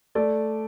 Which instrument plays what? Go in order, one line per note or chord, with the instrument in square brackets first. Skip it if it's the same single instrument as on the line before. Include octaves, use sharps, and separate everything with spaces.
[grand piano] A3 D5